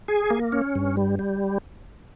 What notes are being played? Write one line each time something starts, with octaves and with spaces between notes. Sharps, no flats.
G#4
A#3
C#4
G2
G3
G3